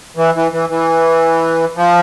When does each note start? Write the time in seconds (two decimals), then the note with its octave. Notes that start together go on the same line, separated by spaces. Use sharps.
0.17 E3
0.35 E3
0.52 E3
0.69 E3
1.76 F3